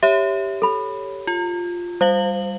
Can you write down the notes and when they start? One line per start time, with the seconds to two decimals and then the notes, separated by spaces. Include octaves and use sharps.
0.03 G4 C#5 E5
0.62 A4 B5
1.27 F4
2.01 G3 C5 F5 F#7